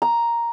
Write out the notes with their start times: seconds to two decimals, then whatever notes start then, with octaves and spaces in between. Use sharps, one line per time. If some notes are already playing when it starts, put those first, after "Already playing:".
0.02 A#5